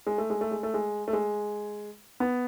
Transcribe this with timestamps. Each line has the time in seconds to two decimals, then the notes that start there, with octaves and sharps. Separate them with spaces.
0.07 G#3
0.18 A3
0.30 G#3
0.41 A3
0.51 G#3
0.63 A3
0.74 G#3
1.08 A3
1.13 G#3
2.20 B3